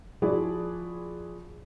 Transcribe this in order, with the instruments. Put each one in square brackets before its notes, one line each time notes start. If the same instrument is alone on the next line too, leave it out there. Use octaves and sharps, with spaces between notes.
[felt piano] F3 E4 F#4 G#4 D5